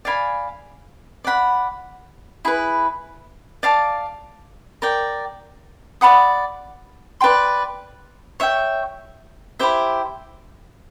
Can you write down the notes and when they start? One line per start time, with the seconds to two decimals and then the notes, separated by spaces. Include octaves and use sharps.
0.05 D5 F5 G#5 B5
1.24 D5 F#5 B5
2.45 E4 G#4 B4
3.63 D5 F5 A5 D6
4.82 A#4 D5 G5
6.01 D5 F#5 B5 D#6
7.21 B4 D5 G5 C6
8.40 C#5 E5 G5
9.59 E4 G4 C5 E5